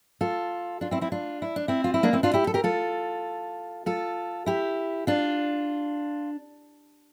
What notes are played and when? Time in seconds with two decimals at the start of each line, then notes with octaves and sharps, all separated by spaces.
0.21 F4 A4
0.81 D4 F4
0.91 C4 E4
1.01 C4 E4
1.12 D4 F4
1.42 E4
1.56 D4
1.68 C4 E4
1.84 F4
1.94 E4
2.03 A#3 D4
2.13 C4 E4
2.23 D4 F4
2.34 E4 G4
2.47 A4
2.54 G4 A#4
2.64 F4 A4
3.86 F4 A4
4.46 E4 G4
5.07 D4 F4